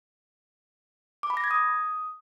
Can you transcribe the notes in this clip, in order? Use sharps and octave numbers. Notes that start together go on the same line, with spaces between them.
D6
B5
A#6
G#6
D#6